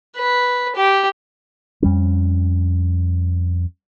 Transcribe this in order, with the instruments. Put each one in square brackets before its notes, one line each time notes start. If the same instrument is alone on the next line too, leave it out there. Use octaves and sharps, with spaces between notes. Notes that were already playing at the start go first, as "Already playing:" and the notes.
[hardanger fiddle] B4
G4
[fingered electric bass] F2 G3 C#4